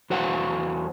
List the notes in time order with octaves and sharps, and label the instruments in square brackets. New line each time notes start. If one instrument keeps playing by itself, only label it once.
[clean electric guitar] E2 F#4 C5 C#5 F5 F#5